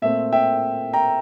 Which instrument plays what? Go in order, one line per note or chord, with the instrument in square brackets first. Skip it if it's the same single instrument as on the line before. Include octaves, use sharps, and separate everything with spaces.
[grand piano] A#2 A3 C4 E5
E5 G5
G5 A#5